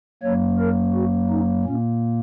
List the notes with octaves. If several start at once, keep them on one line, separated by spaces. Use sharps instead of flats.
F#2 F#3 A#3 C#5
A#4
F#4
D#4
A#2 A#3 C#4